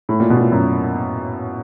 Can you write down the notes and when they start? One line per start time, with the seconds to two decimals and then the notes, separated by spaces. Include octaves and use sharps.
0.09 A2
0.20 A#2
0.30 B2
0.36 A#2
0.41 A2
0.52 F#2